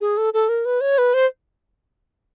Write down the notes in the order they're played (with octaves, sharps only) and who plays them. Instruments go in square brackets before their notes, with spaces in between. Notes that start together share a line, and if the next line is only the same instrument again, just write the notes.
[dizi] G#4
A4
A4
A#4
B4
C#5
B4
C5